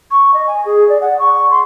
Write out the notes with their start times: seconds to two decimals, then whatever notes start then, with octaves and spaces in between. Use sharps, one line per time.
0.11 C#6
0.34 D#5
0.47 G#5
0.65 G#4
0.89 D5
1.01 F#5
1.19 C#6
1.50 C6